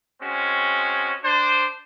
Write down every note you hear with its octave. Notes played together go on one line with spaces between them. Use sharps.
G#3 C4 C#4 F#4
D4 C5